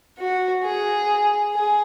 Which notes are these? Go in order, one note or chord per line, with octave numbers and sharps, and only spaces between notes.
F#4
G#4
G#4